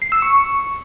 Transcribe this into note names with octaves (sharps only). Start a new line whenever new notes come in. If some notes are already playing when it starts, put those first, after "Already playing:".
C7
E6
C#6
C#6